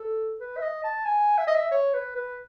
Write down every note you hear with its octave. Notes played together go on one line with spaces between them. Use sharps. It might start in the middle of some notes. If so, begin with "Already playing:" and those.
Already playing: A4
B4
E5
D#5
A5
G#5
E5
D#5
E5
C#5
B4
B4